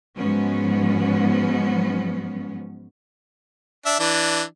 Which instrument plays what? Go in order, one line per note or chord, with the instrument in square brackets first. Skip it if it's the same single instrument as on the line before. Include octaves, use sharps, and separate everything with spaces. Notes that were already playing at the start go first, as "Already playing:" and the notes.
[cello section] G#2 F3 F#3 G#3 B3 C#4
[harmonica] D4 E5
E3 D4